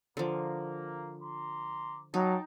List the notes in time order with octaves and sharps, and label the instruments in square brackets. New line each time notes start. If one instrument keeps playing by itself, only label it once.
[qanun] D3 F3 [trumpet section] A#3
[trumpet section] A#5 C6 D6
[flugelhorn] F#3 [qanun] D#4 [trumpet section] G5 A5